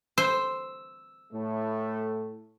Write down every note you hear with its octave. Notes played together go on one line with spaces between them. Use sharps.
C5 E6
A2 A3